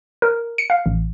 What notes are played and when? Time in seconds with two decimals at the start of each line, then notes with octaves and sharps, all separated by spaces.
0.22 A#4
0.58 C#7
0.70 F5
0.86 A1